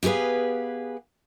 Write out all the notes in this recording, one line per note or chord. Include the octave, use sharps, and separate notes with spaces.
B3 G4 G#4 B4 F5